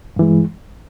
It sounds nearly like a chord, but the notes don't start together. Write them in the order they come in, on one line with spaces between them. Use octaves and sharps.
G2 E3 G#3